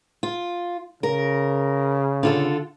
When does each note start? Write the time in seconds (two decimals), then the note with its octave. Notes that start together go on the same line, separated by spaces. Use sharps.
0.23 F4
1.03 C#3 A#4
2.23 D3 F4 A4